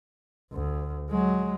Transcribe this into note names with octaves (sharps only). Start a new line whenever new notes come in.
D2
F#3 G#3